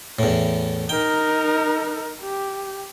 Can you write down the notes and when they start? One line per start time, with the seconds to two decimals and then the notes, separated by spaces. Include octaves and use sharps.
0.19 E2 A2
0.89 D#4 A#4 G5
2.22 G4